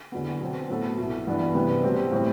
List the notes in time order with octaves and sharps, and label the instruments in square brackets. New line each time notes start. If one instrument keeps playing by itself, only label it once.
[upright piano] E2 D3 F#3 B3
B2 F#3 C4
A2 F#3 B3 F#4 A4
C2 B2 F#3
G2 E3 B3 D4
C3 G3 B3 E4 B4
B2 G3 C4 G4
A2 G3 C4